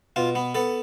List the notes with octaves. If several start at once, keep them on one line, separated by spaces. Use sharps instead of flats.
B2 F4
B3
B3 A4